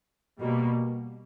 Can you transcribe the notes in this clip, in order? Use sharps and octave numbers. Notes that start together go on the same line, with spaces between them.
B2 G3 A#3